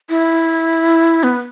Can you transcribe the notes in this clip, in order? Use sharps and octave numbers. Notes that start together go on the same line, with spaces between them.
E4
B3